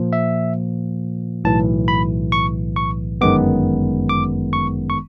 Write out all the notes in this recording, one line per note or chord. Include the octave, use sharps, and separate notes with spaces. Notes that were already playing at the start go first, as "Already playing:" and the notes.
Already playing: A#2 F3 A#3
E5
B1 A2 E3 A5
B5
C#6
C#6
G1 F#2 D#3 G#3 B3 D6
D6
C#6
C#6